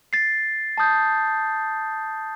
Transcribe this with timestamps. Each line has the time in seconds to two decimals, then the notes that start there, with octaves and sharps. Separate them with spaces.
0.13 A6 C7
0.78 A5 D#6 G6